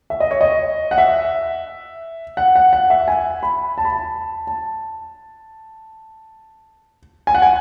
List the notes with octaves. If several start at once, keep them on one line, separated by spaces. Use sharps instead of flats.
E5
D#5
C#5
D#5
F#5
E5
F#5
F#5
F#5
E5
G#5
B5
A5
B5
A5
A5
G#5
F#5
G#5